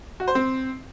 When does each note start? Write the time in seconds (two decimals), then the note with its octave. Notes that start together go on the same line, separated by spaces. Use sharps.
0.20 F#4
0.28 C5
0.35 C4